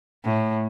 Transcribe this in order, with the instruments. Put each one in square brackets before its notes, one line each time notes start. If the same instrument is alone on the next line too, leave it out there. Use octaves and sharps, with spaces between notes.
[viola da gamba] A2